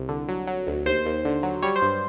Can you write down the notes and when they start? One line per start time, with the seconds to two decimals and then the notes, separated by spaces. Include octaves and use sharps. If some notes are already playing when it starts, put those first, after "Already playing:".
Already playing: C2
0.09 D3
0.28 F#3
0.47 F#3
0.67 D2
0.86 D#2 C5
1.06 D#2
1.25 D3
1.43 F#3
1.63 G3 C#5
1.76 C5
1.82 G2